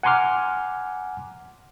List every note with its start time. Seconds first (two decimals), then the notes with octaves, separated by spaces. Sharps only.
0.03 F#5 G#5 A#5 C6 D6 F6